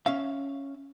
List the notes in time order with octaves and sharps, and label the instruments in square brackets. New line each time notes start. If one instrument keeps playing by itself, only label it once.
[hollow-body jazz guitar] C#4 E5 F5